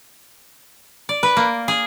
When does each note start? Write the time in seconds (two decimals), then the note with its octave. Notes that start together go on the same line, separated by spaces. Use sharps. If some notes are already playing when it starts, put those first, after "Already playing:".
1.09 D5
1.23 B4
1.37 A#3
1.68 G#4